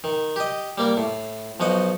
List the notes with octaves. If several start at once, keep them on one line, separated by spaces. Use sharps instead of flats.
D#3
G4 D#5
G3 A#3 A#4
A2
B1 F3 F#4 D#5 F#5